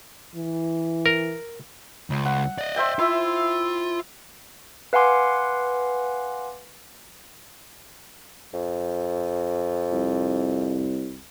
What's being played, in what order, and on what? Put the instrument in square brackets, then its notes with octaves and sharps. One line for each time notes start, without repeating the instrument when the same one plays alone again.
[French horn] E3
[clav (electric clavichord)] A#4
[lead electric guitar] C#2
[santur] F#5
[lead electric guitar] D5 D#5
[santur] C5 E5 G5
[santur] E4 E5 [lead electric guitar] F4
[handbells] B4 F5 F#5 G#5 C6 D6
[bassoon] F2
[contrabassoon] C2